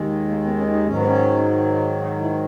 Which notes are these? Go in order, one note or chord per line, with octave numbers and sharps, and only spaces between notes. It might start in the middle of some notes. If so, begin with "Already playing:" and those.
Already playing: D#2 D#3 G#3
A#3
B3
C#4
D#4
G#2 D#3 F#3 C#4
B3
C#4
D#4
E4